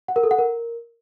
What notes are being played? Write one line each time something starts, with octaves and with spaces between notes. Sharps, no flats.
F#5
A#4
A4
F#5
A#4